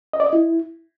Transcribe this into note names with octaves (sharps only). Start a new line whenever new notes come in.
D#5
D5
D#5
E4